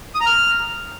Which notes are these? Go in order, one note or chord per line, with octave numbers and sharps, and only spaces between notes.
D#6
A#5
F6